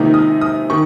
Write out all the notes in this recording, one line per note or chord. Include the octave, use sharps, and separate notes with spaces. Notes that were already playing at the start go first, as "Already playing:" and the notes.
Already playing: C#2 C3 D#3 A#3 D#4
D#6
D#6
D#3 C#6